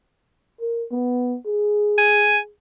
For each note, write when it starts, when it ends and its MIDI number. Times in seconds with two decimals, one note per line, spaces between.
0.60 0.83 70
0.91 1.37 59
1.46 2.49 68
1.98 2.38 80